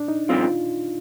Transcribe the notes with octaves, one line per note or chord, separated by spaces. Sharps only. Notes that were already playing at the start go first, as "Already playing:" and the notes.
Already playing: D4
D#4
G2 F3 C4 F4